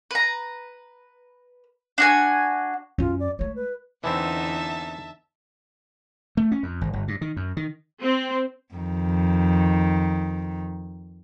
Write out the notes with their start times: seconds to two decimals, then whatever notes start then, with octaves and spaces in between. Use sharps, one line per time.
0.11 B4 A#5
1.98 D4 F#4 G#5
2.99 F#2 C#4 F4
3.20 D5
3.39 G#3 A3 C#5
3.56 B4
4.04 E2 D3 E3 B3 C4 D#4 E5 A5
6.37 A3
6.52 C#4
6.63 F2
6.81 G#1
6.93 G1
7.08 G2
7.21 D#3
7.37 F#2
7.57 D#3
8.01 C4
8.74 F2 D#3